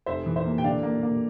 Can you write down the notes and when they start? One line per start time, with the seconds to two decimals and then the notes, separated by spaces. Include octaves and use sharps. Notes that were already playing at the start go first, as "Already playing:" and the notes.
0.06 F1 C5 E5
0.26 E3
0.36 C5 E5
0.45 A#3
0.58 G5
0.64 D3 D5 F5
0.83 A#3
1.03 A#3